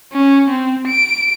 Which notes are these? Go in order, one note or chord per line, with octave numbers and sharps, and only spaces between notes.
C#4
C4
D7